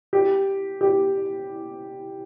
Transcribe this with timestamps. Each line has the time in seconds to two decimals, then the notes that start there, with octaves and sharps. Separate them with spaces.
0.13 G4
0.81 G4